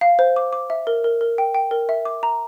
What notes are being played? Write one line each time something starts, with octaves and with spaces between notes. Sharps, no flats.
F5
C5
D6
D6
E5
A#4
A#4
A#4
G5
G5
A#4
E5
D6
A#5